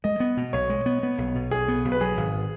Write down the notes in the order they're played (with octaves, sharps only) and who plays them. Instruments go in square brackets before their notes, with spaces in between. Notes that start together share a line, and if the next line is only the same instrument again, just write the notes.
[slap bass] G#3 [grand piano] D#5
[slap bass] B3
B2
[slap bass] B1 [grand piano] C#5
[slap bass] G#3
B3
B3
B1
B2
[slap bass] B1 [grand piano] G#4
[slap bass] B3
B1
[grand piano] B4
[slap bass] F#3 [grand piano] G#4
[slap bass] G#1